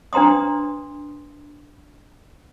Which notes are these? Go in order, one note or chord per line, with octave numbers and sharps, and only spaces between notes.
D4 B4 A#5 C6 D#6